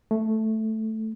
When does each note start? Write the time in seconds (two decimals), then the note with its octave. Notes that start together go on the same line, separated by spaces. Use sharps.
0.11 A3